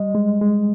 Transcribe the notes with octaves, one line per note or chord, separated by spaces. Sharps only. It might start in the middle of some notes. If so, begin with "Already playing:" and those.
Already playing: G3 D#5
G#3
G#3